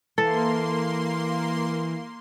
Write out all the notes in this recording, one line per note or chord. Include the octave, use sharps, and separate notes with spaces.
E3 A#3 A4 C6